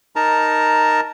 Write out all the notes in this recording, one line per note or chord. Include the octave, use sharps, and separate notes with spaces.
D#4 A#4 A5 A#5